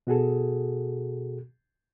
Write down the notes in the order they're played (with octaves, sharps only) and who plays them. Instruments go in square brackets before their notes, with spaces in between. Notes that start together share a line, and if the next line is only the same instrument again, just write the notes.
[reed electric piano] B2 F#4 G#4 A4